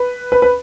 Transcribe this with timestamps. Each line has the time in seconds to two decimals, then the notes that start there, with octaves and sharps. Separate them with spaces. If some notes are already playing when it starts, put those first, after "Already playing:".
Already playing: B4
0.32 B4
0.42 B4